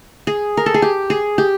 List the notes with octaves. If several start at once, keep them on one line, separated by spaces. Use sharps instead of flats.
G#4
A#4
A4
G#4
G4
G#4
G4